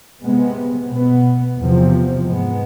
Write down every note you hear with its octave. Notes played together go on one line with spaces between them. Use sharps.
C3 G#3 B3
B2 B3
E2 C3 F3
G#2 G#3 B3